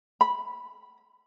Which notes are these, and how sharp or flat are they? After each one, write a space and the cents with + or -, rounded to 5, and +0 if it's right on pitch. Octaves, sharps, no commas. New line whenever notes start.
B5 -10